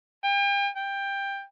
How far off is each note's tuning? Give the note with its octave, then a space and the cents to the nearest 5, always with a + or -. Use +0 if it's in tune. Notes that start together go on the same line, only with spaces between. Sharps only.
G5 +40
G5 +15